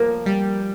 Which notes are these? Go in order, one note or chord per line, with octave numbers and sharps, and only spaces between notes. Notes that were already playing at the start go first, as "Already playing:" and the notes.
Already playing: F3 A#3
G3